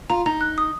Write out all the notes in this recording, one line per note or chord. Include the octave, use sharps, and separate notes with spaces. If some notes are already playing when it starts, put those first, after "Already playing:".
F4 A#5
D#4 A#5
F#6
D#6